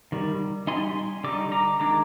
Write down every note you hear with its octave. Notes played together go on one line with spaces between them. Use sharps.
D#3 G3
G3 C4 D#4 G#5 C6
D3 G3 D#4 D6
A#5 D6
D#3 G#3 D4 A#5 D6